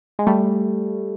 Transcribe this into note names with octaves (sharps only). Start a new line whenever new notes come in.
G#3
G3 A3